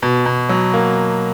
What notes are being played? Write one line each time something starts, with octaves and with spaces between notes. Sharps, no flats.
B2
B2
F#3
A#3